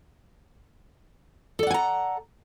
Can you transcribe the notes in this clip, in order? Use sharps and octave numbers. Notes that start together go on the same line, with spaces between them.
A4 D5 F#5 G#5 A#5